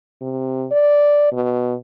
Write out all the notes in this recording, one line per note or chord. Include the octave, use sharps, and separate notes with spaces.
C3
D5
B2